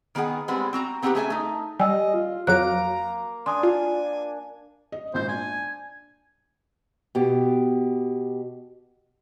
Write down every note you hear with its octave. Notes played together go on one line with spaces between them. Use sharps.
D#3 B3 D#4 G#4 F#5
G3 G#3 B3 C4 B4
C4 F#4 A#5
B3 C4 D#4 F4 G4 B4
A3 C#4 G#4 B4 E5 G#5
A3 D#4
G3 D#5 G#5 E6
F4
F2 F#3 A#3 A#5 F#6 D7
D4 G#5 C6 D#6
F4
D#5
G#1 A#2 C5 G6
D4 G#5
B2 G4